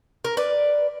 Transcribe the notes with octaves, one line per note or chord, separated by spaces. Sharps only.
A#4
B4 D5